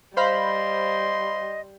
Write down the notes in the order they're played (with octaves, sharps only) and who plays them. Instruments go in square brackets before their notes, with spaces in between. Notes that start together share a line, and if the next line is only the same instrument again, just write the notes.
[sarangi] G3 [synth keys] C5 F5 B5 [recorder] D#5 [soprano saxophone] C6